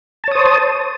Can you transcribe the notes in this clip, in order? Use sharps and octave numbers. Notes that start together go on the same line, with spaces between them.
C5 C#5 A5 D#6